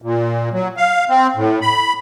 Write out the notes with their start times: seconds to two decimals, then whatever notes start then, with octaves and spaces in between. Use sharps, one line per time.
0.02 A#2
0.52 F#3
0.77 F5
1.09 C4
1.36 A2
1.61 B5